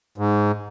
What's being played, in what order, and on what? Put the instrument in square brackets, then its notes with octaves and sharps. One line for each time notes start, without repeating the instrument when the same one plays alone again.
[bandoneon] G#2